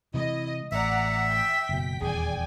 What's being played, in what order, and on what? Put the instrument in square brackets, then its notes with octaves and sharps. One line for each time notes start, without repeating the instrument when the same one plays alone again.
[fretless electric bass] C3 E3 G#3 [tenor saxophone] E4 [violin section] D#5
[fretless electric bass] A1 [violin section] D5 F#5 A#5 [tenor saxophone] E5
[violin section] G5 B6
[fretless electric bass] F#1 B2
[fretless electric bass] D#1 E2 [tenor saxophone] G#4 [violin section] D5 G5 G#5